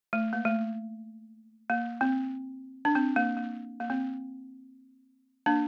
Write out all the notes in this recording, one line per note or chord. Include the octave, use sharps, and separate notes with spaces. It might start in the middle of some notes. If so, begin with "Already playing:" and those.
A3
A#3
A3
A#3
C4
D4
C4
A#3
A#3
A#3
C4
A#3 D4